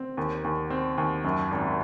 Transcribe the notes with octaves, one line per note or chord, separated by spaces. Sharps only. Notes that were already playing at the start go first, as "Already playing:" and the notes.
Already playing: C4
D#2
D#2
C4
D#2
F#2
G#1